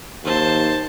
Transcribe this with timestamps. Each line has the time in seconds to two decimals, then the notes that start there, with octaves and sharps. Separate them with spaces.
0.24 D#2 C5 A5